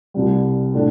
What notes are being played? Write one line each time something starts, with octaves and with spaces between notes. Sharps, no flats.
C2 C3 G3
A2 A3 D4